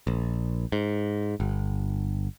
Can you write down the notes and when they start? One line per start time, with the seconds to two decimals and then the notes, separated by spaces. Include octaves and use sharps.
0.07 A#1
0.72 G#2
1.40 G1